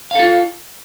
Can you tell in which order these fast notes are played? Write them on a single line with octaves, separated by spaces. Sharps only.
F5 A4 F4